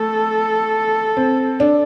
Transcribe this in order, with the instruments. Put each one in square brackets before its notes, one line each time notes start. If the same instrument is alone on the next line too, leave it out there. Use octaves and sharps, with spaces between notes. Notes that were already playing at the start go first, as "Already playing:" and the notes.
Already playing: [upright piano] A3 [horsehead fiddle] A4
[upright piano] C4
D4